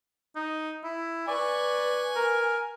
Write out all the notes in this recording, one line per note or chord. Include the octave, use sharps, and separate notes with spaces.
D#4
E4
B4 D5 G#5 C#6
A#4